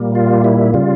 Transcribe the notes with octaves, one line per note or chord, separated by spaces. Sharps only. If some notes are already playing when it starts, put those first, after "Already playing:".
Already playing: A#2 G3 A#3
F4
E4
C#3 G3 F4